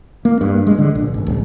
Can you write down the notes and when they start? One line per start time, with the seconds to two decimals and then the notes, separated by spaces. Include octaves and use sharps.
0.25 A#3
0.41 G2
0.67 G#3
0.78 D3
0.95 A#1
1.14 G#1
1.27 D1